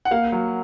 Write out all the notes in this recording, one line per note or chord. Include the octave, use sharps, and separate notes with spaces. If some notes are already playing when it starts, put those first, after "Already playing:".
F#5
A#3 F5
F#3